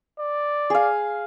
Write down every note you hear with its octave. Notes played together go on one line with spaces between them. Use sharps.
D5
G#4 F5